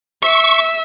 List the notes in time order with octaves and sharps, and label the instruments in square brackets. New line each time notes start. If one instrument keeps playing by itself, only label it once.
[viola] E5 [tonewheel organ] C#6